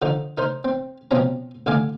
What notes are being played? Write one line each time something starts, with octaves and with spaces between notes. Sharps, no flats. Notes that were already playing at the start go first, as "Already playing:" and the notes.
D3 F3 D#4
D#4 A#4 C5
C4
B2 F3 C4 C#4 A#5
A1 D3 F5 G#5 D6